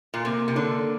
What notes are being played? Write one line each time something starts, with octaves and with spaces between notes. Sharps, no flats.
A#2
C3 A#3
C3
D3 D4